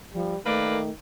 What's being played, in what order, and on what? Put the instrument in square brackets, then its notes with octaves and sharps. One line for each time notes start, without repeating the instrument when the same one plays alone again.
[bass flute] F3 [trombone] G3
[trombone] D#3 [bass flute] A3 [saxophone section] A#3 B4 D5